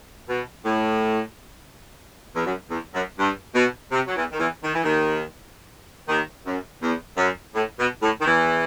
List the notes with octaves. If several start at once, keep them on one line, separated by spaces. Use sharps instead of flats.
B2
A2
E2
F#2
E2
F#2
G2
B2
C3
F#3
E2 E3
D#3
E2 E3
D#3
E3
D#2 D#3
D#2 D#3
F#2
E2
F#2
A2
B2
A2
D#3
E2 E3